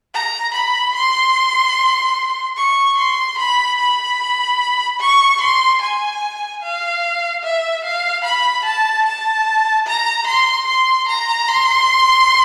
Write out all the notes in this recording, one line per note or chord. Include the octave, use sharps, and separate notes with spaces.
A#5
B5
C6
C#6
C6
B5
B5
C#6
C6
G#5
F5
E5
F5
B5
A5
A5
A#5
C6
C6
A#5
C6